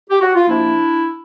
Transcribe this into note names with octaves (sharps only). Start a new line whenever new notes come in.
G4
F#4
F4
C3 F3 A#3 D4 E4